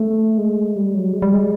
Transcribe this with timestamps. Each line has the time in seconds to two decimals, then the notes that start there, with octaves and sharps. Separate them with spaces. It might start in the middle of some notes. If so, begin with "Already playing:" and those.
Already playing: A3
0.38 G#3
0.76 G3
0.94 F#3
1.13 G#3
1.22 G3
1.33 G#3